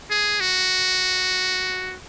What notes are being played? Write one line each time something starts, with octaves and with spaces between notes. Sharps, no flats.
G#4
F#4